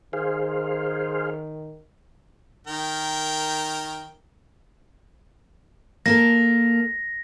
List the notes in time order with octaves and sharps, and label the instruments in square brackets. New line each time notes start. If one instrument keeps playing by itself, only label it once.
[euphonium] D#3 [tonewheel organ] G#4 C5 F5
[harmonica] D#3 A#4 G5
[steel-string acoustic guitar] A#3 A4 A#4 [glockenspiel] A#6